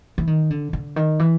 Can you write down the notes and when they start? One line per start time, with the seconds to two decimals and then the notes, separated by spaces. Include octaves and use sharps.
0.18 E3
0.27 D#3
0.50 D3
0.73 D3
0.96 D#3
1.19 E3